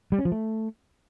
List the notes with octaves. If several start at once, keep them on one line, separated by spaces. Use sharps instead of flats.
G3
C#4
F3
A3